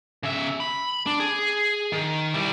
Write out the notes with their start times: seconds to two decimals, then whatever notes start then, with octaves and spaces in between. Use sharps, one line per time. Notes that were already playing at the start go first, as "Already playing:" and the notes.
0.23 C#3 E5
0.60 B5
1.06 D4
1.20 G#4
1.92 D#3
2.34 G3 E4